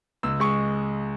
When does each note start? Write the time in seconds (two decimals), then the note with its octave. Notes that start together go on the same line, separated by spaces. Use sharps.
0.23 C#2 E6
0.40 G#3 C#6